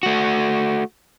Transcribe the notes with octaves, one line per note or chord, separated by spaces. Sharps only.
A3 F#4